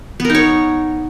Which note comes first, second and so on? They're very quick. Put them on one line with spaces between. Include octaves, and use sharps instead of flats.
B3 A#4 D#4 C#5